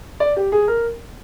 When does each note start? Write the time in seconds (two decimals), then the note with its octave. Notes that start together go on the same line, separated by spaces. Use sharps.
0.20 D5
0.36 G4
0.52 G#4
0.68 A#4